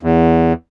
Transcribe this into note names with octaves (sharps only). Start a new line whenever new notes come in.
E2